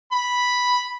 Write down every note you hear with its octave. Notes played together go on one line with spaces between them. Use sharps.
B5